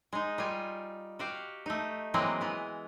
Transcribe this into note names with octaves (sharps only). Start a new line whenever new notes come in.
G#3 D#4
G3 F4 G#5
F#4 G4 F5
A3 D#4
E3 F#3 G#3 A#3 C4
E3 B3